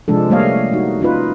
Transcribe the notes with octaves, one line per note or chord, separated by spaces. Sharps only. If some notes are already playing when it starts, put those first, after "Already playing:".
C3 F3 G#3 D4 A4
G3 A3 A#3 C#5 D#5 F5
D#4 F#4
C#4 D#4 F4 B4